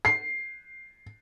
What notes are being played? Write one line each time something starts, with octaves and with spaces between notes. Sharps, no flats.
C7